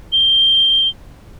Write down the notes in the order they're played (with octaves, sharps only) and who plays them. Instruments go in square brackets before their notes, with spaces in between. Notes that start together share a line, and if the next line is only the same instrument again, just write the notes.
[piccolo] G7